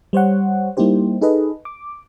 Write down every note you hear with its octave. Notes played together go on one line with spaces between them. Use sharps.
G3 C5 C#5 F#5
G3 A#3 D#4 E4 G4 C5
D#4 G#4 A4 B4 D#5
D6